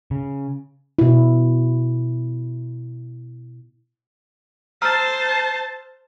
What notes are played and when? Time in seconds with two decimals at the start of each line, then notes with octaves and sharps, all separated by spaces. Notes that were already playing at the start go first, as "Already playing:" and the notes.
0.11 C#3
0.99 B2 E4
4.82 C5 A5 A#5 E6 F6